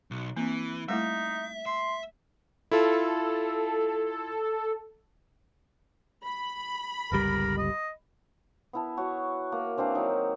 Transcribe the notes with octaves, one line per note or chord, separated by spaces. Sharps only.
B1
E3 A#3 C4
G3 A3 D#4 E4 E5
E5 C6
E4 F4 A4
B5
G1 C#2 G3 A#4
D#5
B3 E4 A5
F#4 C#5
A#3
E3 C4 D4 F5
D#3 F#3 D#4